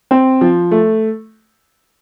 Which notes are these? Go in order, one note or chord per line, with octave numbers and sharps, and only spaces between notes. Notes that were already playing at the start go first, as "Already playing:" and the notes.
C4
F3
A3